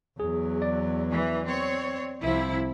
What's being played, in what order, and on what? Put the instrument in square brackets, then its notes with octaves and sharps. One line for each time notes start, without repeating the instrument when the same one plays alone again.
[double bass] E2 F#3 [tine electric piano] G#4
[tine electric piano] D5
[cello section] E3
C4 C#5
[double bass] C2 F3 [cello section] C3 E4